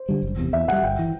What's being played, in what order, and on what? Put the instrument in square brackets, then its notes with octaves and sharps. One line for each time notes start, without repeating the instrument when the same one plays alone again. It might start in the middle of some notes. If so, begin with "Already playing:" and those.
Already playing: [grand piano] C5
[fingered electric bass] D3 G3
F#1
E2 C3
[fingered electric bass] E2 [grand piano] E5
[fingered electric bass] C3 G3 [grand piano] F#5
[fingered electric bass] G1 [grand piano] G5
[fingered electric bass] E3